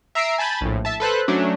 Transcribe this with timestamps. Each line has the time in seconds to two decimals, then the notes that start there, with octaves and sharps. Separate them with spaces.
0.15 E5 A#5 E6 C7 D7
0.38 G#5 A5 B5 G6 A6
0.61 A#1 A2
0.85 E5 A5
1.00 A4 B4 C5 F#6
1.28 F#3 A3 C#4 D4